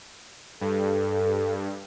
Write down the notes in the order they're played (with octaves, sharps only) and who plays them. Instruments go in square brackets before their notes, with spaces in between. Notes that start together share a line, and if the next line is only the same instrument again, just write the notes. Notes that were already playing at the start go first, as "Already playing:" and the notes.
[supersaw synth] G2 [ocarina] A4